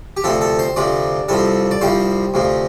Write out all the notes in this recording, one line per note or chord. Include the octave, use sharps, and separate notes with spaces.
G4
D2 C3 F3 A4
A4
C5
D2 C3 F3 D5
C2 C3 F3 A4
D5
C2 C3 F3 C5
D2 C3 F3